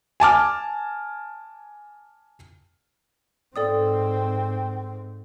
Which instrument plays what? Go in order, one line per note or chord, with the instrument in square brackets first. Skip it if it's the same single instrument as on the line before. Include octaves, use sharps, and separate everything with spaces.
[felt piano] G#5 A5 D6 F6
[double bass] G#2 C4 [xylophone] A4 D5 D#6 [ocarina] G5